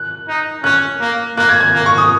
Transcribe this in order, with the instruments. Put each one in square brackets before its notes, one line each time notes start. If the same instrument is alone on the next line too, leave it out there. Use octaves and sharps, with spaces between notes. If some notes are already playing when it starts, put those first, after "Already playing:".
Already playing: [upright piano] F#6
[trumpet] D#4
[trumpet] C#4 [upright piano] F#6
[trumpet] A#3
[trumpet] A#3 [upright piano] F#6
[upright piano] G#6
G#6
[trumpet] A#3
[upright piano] C#6
D#6